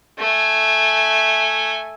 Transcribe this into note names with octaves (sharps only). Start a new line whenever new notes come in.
A3 G#5